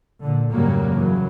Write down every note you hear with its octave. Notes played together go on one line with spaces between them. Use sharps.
A#2 D3
F2 G#2 C#3 F#3 G3 A#3
G2 C#3 E3 F#3